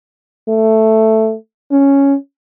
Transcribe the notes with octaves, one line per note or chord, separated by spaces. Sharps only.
A3
C#4